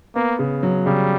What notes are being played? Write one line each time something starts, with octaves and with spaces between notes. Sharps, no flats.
A#3 B3
C#3
F#3
C#3 G3